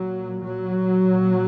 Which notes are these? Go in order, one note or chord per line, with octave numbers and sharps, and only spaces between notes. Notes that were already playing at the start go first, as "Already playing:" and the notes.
Already playing: A#2 F#3
F#3
A#2